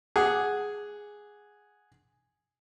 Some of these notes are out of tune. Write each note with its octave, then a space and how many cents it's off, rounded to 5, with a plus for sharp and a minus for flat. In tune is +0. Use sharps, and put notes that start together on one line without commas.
G#4 +0 F#5 +0 D6 +0